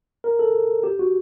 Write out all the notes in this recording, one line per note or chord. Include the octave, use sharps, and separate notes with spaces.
A#4
A4
G4
F#4